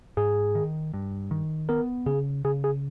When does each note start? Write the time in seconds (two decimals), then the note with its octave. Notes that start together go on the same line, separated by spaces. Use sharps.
0.17 G#2 G#4
0.55 D#3
0.93 G2
1.31 D#3
1.69 B3 A#4
2.06 C#3 G#4
2.45 C#3 G#4
2.64 G#4